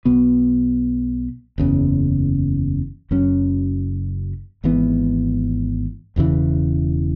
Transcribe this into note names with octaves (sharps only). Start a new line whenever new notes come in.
B1 B2 B3
F#1 E2 C#3
F#1 F#2 F#3 C#4
G#1 G#2 E3 B3
E1 E2 C#3 E3